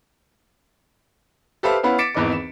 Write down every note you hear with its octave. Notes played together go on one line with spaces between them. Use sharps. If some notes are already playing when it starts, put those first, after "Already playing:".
G4 A4 B4 C5 E5 F5
B3 C#4 E4 B4 F5 F#5
D6 A6 B6 C#7 D7 E7
G#1 E2 E3 B4 D#5 D6
E7